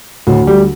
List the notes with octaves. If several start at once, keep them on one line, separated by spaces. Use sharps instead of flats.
D2 A2
G3